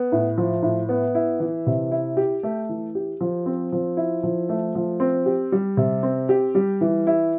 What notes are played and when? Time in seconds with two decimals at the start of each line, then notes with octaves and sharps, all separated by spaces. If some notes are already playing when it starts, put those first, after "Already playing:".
Already playing: B3
0.12 A2
0.38 F3
0.63 A2
0.89 B3
1.15 E4
1.40 E3
1.67 C3
1.92 E4
2.17 G4
2.43 A3
2.69 E3
2.95 G4
3.21 F3
3.46 C4
3.72 F3
3.97 E4
4.23 F3
4.49 A3
4.75 F3
5.00 C4
5.26 G4
5.52 G3
5.77 C3
6.03 C4
6.29 G4
6.55 G3
6.81 E3
7.07 E4